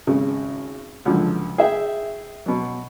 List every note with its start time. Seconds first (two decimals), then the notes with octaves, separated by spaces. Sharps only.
0.07 G#1 C#3
1.05 C#2 D3 F3 F#3
1.58 G#4 E5 G5
2.46 B2 F#3